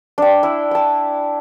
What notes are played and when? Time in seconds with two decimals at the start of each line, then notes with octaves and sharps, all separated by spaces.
0.18 D4 G5
0.43 E4
0.71 G5 A5